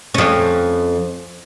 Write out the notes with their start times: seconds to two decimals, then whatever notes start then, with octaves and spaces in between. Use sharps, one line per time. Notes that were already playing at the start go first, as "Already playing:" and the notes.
0.14 F2 C#4